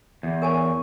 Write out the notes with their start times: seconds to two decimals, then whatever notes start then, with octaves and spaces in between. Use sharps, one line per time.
0.23 E2
0.42 A#4 C#5 G#5 A5